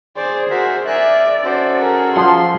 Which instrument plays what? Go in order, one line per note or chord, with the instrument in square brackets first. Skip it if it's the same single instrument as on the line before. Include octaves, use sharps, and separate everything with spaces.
[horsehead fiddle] G#4 [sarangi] C5 [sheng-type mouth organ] D5
[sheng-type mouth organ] F#4 A#4 E5 [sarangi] C5
[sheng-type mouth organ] G#4 A#4 F#6 [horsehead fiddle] D5 [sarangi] E5
[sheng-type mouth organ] C#4 F#4 A4 [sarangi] C5
[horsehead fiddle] G#4 [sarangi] A#4
[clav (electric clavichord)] F3 F4 F#5 [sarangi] C6